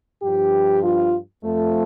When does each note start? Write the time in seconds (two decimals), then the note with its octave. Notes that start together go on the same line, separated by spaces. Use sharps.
0.23 G2 F3 G4
0.83 F4
1.44 F2 F3 A3